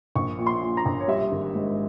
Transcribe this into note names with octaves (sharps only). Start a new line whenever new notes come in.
A#1 C#6
A#2
C6
A#2
A#5
A#1
C#5
G3 E5
G#1
G#2